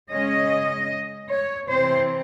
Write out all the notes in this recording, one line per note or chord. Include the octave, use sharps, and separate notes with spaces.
C#3 G#3 C#4 D#5
C#5
C3 E3 C4 C5